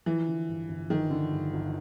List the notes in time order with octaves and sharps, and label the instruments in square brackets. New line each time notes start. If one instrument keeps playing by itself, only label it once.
[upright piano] E3 [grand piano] F3
[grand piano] D3
G2
G1
[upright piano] D#3 [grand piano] F3
[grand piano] D3
G2
G1